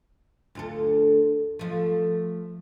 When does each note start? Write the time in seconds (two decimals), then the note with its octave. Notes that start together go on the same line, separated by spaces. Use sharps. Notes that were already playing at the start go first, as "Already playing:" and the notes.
0.55 D2 F4 A4
1.59 F3 A3